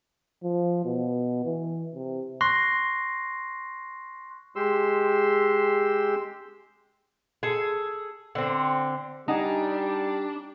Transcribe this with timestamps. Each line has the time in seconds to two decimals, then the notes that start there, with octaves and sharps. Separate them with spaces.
0.44 F3
0.85 B2
1.45 E3
1.95 C3
2.41 C6 C#6 F#6 A#6 C7
4.56 G#3 G4 C6 E6
7.43 G#4 A4
8.35 D3 C4
9.28 G3 D4 D#4 F#5 G#5